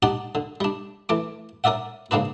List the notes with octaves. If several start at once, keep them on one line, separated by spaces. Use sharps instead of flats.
D4 D#4 G4 D5 F#5 A5
D3
G3 D4
E3 A3 D6
C#4 A#4 D5 E5 F#5
G#2 C#3 A#3 D4 B4